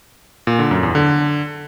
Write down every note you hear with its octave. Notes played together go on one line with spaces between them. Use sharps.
A#2
D3
F#2
E2
D3